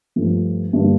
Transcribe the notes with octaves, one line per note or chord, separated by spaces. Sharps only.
G2 F3 A3
G2 D3 G3 A#3 D4